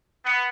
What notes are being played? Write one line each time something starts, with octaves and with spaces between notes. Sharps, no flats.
B3